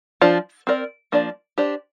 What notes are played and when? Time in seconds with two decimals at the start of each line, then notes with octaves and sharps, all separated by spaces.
0.21 F3 D4 F4 C5
0.67 C4 A#4 D5
1.12 F3 A#3 D4 D5
1.58 D4 G4 C5